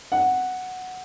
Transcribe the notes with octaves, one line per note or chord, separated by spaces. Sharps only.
F#5